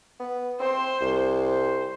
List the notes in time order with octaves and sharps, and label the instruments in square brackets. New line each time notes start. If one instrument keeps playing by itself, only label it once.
[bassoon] B3
[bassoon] C4 [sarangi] C5
[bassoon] C2
[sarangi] C5